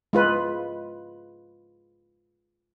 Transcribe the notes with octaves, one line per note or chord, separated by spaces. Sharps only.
G#3 F4 B4